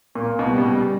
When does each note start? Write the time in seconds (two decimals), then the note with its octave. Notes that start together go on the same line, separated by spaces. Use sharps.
0.15 A#2 A#3
0.39 B2
0.51 G3
0.58 B2
0.64 C#3